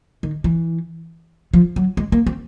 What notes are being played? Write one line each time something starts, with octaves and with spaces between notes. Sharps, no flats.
D#3
E3
F3
F#3
G#3
A#3
C4